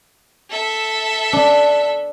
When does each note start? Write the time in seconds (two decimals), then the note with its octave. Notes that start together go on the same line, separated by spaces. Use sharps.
0.50 A4 E5
1.33 D4